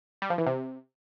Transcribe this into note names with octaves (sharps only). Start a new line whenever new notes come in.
G3
F3
E3
C3